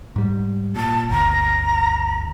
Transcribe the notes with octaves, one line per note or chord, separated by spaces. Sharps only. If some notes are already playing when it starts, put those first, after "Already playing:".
G#2 G3
A#2 A5
G1 D2 A#5